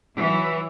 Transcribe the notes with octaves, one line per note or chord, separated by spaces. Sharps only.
E3 F#3